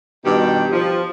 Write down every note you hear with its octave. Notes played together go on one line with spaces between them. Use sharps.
G2 B2 D#3 G4
F3